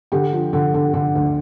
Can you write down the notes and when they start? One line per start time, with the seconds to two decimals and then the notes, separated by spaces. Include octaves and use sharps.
0.12 D3 G4
0.33 F3
0.53 D3
0.74 D3
0.94 D3
1.15 D2